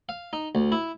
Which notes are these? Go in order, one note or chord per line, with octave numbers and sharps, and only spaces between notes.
F5
D#4
D2
E4